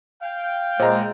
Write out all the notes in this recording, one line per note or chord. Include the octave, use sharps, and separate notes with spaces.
F5 G5
A#2 G#3 C5 A#5